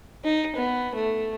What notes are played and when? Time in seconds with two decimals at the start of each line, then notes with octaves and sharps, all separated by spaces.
0.24 D#4
0.56 B3
0.95 A3